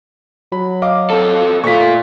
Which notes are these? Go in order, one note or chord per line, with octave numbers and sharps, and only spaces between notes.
F#3 B5
D#5 F5 D6
C4 A4
A#2 A3 F4 C#6 B6